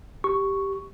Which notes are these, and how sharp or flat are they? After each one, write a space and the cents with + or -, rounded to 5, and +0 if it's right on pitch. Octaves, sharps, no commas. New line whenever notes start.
G4 +0 C#6 +0